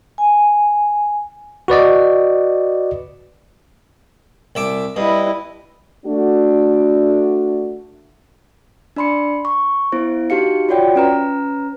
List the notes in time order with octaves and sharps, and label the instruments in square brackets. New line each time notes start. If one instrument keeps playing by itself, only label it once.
[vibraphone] G#5
[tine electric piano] F#4 B4 D5 D#5
[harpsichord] C2 E5 D6
[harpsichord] G2 [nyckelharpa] E4 D#5
[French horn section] A3 D4 F#4
[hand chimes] D4 D5 B5 C6 C#7
C#6
B3 E4 C5
D#4 F#4 G4 F5 C#7
F4 F#4 C#5 D5 F#5 G5
C#4 B4 A#5